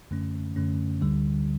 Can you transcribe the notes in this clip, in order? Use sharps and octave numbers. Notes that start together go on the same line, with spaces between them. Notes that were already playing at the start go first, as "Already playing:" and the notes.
F#2 D3 A3 C#4
F#2 D3 A3 C#4
D2 D3 G3